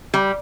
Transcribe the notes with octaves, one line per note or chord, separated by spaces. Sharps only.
G3